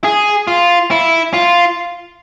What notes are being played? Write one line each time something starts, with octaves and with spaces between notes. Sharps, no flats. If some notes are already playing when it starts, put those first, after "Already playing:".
G#4
F4
E4
F4